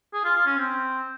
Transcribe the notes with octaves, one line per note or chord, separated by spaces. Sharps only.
G#4
F4
F4
C#4
C4